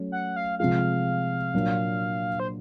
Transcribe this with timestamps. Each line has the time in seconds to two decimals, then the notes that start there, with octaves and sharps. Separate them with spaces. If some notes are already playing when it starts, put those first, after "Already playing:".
Already playing: F#3 A3 C#4
0.12 F#5
0.36 F5
0.59 C3 F3 G#3 F5
1.54 A#2 F#3 A#3 D4
2.40 C5